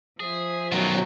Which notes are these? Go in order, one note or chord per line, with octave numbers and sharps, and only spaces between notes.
F3 G#4 C5 E5
B2 D#3 F#3 B3 F4